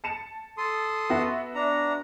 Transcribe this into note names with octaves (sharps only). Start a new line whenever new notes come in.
A5 C#7 E7
A4 C6 D#6
B3 F#4 E5
D4 A#5